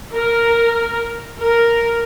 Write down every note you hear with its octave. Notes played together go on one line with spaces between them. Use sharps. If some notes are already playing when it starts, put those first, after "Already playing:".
A#4
A#4